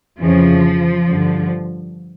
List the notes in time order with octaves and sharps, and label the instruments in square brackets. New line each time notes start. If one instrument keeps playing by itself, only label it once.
[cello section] F2 C#3 E3 F3
G2 D3